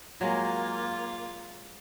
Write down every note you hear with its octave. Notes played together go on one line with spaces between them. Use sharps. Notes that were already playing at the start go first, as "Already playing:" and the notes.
F#3 G#3 A#3 F4